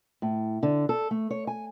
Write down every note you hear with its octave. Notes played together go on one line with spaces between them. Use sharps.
A2
D3
A4
A3
C#5
G#5